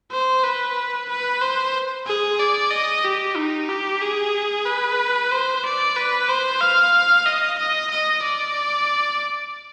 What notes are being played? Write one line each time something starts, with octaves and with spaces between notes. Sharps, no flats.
C5
B4
B4
C5
G#4
D5
D#5
G4
D#4
G4
G#4
B4
C5
D5
B4
C5
F5
D#5
D#5
D#5
D5